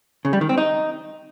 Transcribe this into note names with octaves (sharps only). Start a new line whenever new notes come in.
C#3
G3
D#3
C4
D#4